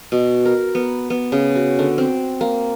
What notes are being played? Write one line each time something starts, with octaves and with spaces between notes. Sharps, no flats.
B2
A#4
B3
B3
C#3
F#4
D3
C4
A#3